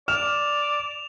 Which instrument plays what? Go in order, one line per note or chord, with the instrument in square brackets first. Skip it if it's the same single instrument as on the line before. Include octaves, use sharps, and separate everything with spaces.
[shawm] D5 [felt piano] F6 [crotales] E7 F7